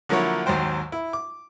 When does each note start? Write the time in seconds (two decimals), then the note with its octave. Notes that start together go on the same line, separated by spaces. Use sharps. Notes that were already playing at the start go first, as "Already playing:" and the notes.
0.09 D3 F3 F#3 A#3 E4 C#5
0.46 D#2 G#2 F#3 C5 G5
0.92 E4
1.13 D6